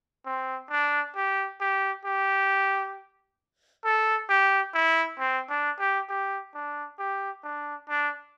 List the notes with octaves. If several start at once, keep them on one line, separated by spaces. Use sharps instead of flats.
C4
D4
G4
G4
G4
A4
G4
E4
C4
D4
G4
G4
D4
G4
D4
D4